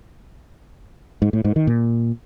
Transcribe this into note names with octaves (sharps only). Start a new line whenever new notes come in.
G#2
A2
G#2
D#3
A#2